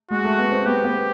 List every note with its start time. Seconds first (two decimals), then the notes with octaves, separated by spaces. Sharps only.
0.11 G#3 F#4
0.24 A3
0.38 B3
0.52 C4
0.66 B3 G4
0.84 B3